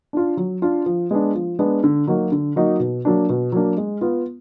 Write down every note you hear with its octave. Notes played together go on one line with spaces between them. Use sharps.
D4 F4
F#3
D4 F4
F3
G#3 B3 D4
F3
G#3 B3 D4
D3
F#3 A#3 D#4 F#4
D3
F#3 A#3 D#4 F#4
B2
F#3 A#3 D4
B2
F#3 A#3 D4
G#3
B3 F4